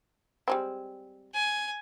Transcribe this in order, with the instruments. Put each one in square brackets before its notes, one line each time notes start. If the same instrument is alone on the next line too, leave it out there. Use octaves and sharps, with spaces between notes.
[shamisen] G3 G#3 C4
[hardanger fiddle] G#5